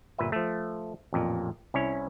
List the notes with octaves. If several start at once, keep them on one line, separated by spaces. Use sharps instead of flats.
G1 A#2 B4 E5
F3 A3
A1 F2 A#2
C2 C#4 E4 C#5